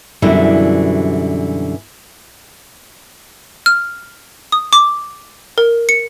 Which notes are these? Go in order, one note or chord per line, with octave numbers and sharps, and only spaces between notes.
F#2 B2 D3 E3 G3 E4
F6
D#6
D6
A#4
C#7